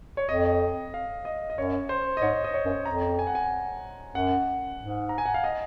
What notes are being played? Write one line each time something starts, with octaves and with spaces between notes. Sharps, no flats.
C#5
F2 D#5
F5
D#5
D#5
F#2 C#5
C5
D#5
G#2 C#5
D#5
C#5
F#2
F2 A#5
G#5
F#5
G#5
F#2 F#5
G#2
A#5
G#5
F#5
F5
D#5